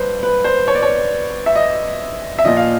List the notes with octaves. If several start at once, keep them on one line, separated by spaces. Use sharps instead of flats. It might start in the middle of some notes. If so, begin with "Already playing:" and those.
Already playing: G2 B4 C5
B4
C5
C#5
D5
C#5
E5
D#5
E5
A#2 F3 D#5
F5